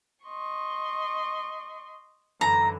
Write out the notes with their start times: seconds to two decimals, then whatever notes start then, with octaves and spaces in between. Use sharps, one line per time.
0.25 D#5 C6 C#6
2.41 F#2 D3 E3 A#5